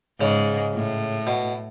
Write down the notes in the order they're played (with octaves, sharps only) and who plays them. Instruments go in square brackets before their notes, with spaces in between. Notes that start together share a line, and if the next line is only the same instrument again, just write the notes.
[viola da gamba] G#2 [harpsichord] C#3
[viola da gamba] A2
[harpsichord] B2